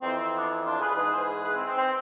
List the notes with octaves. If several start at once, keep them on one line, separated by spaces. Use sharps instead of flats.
F2 E3 C4
C4
B3 D4
D4 F4
G#4 B4
G#2 E3 G#4 B4
C5
G#4 B4
G#4 B4
C4
C4
C4